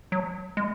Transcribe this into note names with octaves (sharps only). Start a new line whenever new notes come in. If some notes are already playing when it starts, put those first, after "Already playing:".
F#3
G#3